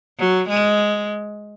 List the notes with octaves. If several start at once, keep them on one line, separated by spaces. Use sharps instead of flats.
F#3
G#3